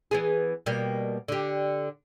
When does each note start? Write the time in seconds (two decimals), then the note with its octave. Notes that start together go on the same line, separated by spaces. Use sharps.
0.11 E3 B3 G#4
0.66 B2 G3 A#3
1.28 D3 G4